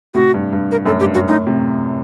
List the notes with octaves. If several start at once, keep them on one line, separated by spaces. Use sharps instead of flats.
A2 C3 F#4
G2
G2
A#4
F#2 A2 A4
G2 G4
F#2 F#4
F#2 A2 D#4
A2 C3